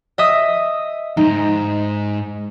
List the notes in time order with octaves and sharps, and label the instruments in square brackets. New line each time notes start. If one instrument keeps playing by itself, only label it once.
[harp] D#5 E5 D#6
[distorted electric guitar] F2 G#2 [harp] D#4